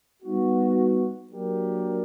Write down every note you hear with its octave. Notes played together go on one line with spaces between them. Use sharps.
G3 B3 D#4 F#4
F#3 A#3 D4 G4 A#4